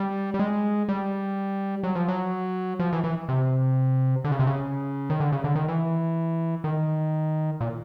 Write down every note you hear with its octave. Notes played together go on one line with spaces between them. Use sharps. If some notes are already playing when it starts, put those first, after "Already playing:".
Already playing: G3
G3
G#3
G3
F#3
F3
F#3
F3
E3
E3
C3
D3
C#3
C3
C#3
D#3
D3
C#3
D3
D#3
E3
D#3
A#2